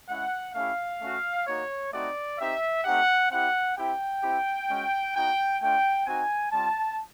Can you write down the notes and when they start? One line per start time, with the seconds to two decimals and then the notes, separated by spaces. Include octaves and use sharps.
0.09 G#3 C#4 E4 F#5
0.55 A3 C#4 E4 G4 F5
1.01 A3 C#4 F#4
1.47 A#3 D#4 F#4 C#5
1.92 A3 C4 D#4 F#4 D5
2.39 C4 D#4 G4 E5
2.84 A3 C4 D#4 G4 F#5
3.30 C4 E4 G4 F#5
3.77 C4 E4 G4 G5
4.22 C4 E4 G4
4.69 G#3 C#4 F#4
5.15 B3 D#4 F#4 G5
5.61 A3 D4 F4 G5
6.07 C4 D#4 F#4 G#5
6.52 G3 C4 F4 A5